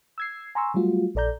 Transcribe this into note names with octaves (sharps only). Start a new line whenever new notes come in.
E6 G#6 C7
G#5 A#5 C6 C#6 E6
F#3 G3 A3 F4 F#4
A#1 A4 D5 A#5 G6